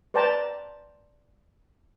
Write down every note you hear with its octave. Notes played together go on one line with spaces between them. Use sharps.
B4 C5 D5 G5 A5 A#5